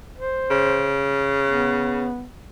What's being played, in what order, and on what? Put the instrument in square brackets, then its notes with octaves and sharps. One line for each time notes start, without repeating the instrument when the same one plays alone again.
[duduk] C5
[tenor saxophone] C#3
[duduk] B3